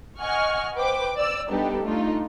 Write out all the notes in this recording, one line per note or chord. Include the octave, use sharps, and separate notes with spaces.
D#5 F#5 G#5 C#6 F6
B4 C5 G5 D6
D5 E6
G3 B3 D4 D#4 G4 A4
A3 D4 D#4 F4